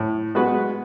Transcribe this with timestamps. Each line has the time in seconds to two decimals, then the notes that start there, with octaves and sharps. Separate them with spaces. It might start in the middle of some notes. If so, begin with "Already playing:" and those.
Already playing: A2
0.35 G#3 B3 F#4 B4